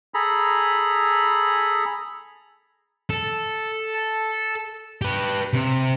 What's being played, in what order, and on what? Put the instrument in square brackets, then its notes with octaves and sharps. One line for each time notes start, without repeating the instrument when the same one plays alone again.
[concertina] G#4 A4 A#5 B5
[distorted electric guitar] A4
G4 B4
C3